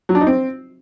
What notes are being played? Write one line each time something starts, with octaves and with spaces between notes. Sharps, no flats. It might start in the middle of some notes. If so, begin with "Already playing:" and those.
F#3
D4
D#4
C4